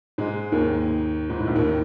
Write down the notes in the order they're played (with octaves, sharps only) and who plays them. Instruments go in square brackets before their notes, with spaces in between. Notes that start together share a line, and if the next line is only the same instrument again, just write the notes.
[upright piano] G#2 G#3
D#2 D#3
G#2
A2
A#1 A#2
D#2 D#3